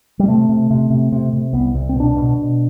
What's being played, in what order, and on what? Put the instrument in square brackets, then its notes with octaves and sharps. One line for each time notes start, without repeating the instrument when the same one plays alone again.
[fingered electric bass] G3
C3 A3
C3
C3
C3
C3
C3
C2 B3
C2
C4
B2 D4
B2
B2